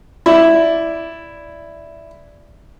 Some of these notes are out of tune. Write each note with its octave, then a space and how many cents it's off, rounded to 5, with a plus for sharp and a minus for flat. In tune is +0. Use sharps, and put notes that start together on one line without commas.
E4 +0 D5 -5